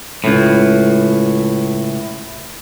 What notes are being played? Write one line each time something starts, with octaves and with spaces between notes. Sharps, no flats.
C#2 A2